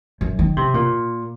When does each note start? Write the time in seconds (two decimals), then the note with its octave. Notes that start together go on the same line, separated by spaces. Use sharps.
0.21 F#2
0.39 D#3
0.57 C3
0.74 A#2